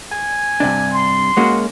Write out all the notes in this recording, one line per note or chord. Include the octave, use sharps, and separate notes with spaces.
G#5
G2 C3 D4
C6
G#3 A#3 C#4 F#4